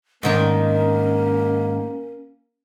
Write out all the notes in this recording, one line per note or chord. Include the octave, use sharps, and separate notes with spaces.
G#2 D#3 A#3 C#4 D4